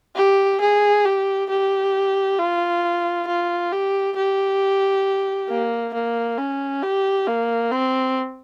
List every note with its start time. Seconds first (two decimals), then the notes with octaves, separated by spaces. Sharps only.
0.16 G4
0.60 G#4
1.05 G4
1.49 G4
2.38 F4
3.27 F4
3.72 G4
4.16 G4
5.49 A#3
5.94 A#3
6.38 C#4
6.83 G4
7.28 A#3
7.72 C4